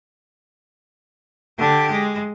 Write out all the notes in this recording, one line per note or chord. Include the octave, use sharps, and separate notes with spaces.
D3 G4
G#3